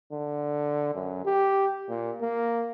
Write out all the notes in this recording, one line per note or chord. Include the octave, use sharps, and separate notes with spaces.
D3
F#2
G4
A#2
A#3